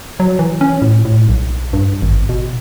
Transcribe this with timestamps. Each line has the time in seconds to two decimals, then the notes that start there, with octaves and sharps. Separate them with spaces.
0.20 F#3
0.39 E3
0.61 C#4
0.82 A2
1.05 A2
1.29 B1
1.73 G2
2.02 G#1
2.29 B2